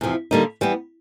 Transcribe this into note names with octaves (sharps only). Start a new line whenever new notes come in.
E2 C3 F3
D3 G3 A#3 D#4
E3 G3 B3